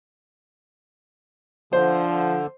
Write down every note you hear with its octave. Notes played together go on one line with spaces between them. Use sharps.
D3 F3 C5